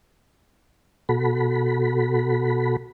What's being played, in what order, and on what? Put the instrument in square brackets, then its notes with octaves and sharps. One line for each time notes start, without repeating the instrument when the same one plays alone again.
[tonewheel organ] B2 F#4 A4 B5